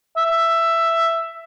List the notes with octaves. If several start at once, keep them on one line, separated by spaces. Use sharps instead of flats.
E5